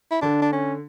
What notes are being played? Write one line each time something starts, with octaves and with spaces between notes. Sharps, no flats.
E4
D3 D4
D4
C#4